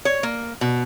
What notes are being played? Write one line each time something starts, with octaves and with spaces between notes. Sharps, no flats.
C#5
A#3
B2